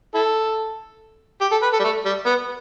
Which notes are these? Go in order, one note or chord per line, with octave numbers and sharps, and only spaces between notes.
E4 A4
G4
A4
B4
A4
G3
A3
G3
B3